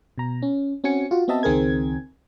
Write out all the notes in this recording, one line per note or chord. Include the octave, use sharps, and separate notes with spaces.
B2 A#5
C#4
C4 C#4 F#4 G#5 C#7
F4 F#4
B3 C4 F#4 D#5 E5 A5
C#2 D#3 C4 G#4 A#4 G#6